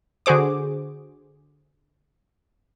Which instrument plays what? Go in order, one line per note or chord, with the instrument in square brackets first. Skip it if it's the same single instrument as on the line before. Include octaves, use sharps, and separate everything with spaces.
[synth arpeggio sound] D3 F#4 G#4 C5 D6